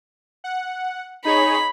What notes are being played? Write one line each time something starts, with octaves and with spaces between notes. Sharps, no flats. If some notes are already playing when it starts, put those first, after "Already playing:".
F#5
D#4 G#4 C#5 B5